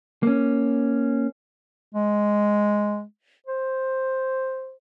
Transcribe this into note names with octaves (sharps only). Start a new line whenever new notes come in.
A#3 C#4
G#3
C5